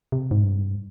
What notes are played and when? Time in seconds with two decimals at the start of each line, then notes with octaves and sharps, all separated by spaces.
0.12 C3
0.31 G#2
0.43 G2